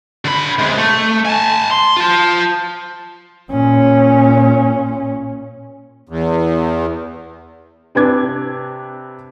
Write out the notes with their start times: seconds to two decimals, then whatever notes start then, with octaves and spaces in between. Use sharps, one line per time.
0.25 D3 B5
0.59 C3 G#3
0.78 A3
1.25 G#5 A5
1.71 C6
1.97 F4 A5
3.50 A#2 C#4
6.09 E2
7.95 C3 D4 B4 D6 G#6